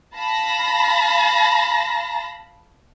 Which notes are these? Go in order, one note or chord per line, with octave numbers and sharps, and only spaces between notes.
F5 A5 B5 A#6